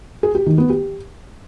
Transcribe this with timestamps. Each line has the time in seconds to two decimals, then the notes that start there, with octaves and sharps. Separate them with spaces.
0.23 G#4
0.35 G4
0.46 D#3
0.58 B3
0.70 G4